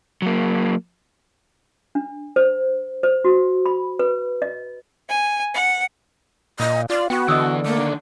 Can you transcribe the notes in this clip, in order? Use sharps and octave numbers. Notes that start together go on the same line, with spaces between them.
F#3 A#3
D4
C5
C5
F#4
B5
B4
D#5
G#5
F#5
A#2 D#5
F4 D5
B3 F#4 G5 C#6
D3 E3 B3 D#5 D#6 E6
A3 A#3
D#3 D4